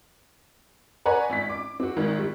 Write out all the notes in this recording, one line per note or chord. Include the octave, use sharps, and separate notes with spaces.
B4 C#5 D5 F#5 G#5 A#5
G#1 B6
D6
C4 F#4
G#1 G#2 D#3
G3